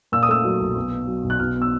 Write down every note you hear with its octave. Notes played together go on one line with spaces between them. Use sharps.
A#2 E6
D#6
A3 E6
F#3
B1
B2
B3
F#3
B1
F#6
B2 F6
B3
E6